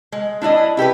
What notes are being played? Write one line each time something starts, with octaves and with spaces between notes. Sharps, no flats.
G#3
D4 E4 D5 D#5
E4 G4 A4 B4